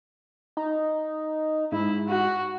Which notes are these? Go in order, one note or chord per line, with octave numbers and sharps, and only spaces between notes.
D#4
G#2 E4
F#4